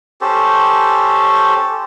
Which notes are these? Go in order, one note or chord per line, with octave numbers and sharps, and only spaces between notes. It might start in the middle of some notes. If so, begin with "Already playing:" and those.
C#4 G4 A4 C5